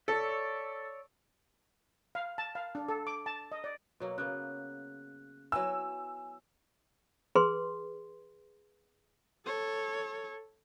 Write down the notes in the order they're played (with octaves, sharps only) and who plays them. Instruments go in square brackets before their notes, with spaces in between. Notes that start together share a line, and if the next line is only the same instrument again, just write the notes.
[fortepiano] A4 [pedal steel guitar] C#5 D5 E5
[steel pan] F5
A5
F5
D4
A4
D6
A5
D#5
D5
[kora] B2 F#3 A#3
[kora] C#3 A#3 B3 [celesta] F#6
[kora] F#3 B3 E4 [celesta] G#5 [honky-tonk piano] E6
[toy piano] G#4 B4 C6
[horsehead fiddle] A4 C#5